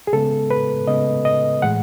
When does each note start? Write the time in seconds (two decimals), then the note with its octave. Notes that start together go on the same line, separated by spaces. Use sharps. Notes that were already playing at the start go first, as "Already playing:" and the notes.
0.07 G#4
0.13 C#3 G#3 B3 A4
0.51 B4
0.87 C#3 G#3 B3 D#5
1.25 D#5
1.62 A2 E3 G#3 F#5